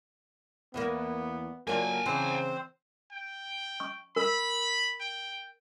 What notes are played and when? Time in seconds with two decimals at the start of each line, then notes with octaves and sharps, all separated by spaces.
0.74 E2 E3 A#3 B3
1.67 F#3 A#3 D4 F4 G5 G#5
2.06 C#3 E3 C4 C5
3.12 G5
3.80 C#6
4.16 A#4 B5 E6
5.00 G5